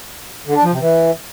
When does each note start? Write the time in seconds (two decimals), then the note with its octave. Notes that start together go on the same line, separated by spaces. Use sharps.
0.47 D3
0.55 D4
0.64 F3
0.72 C3
0.80 E3